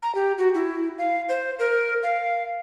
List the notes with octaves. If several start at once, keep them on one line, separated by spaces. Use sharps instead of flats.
A#5
G4
F#4
E4
F5
C5
A#4
F5